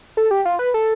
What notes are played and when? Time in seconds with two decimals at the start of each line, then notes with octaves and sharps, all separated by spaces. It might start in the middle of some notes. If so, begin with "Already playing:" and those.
0.17 A4
0.31 G4
0.45 F4
0.59 B4
0.74 A4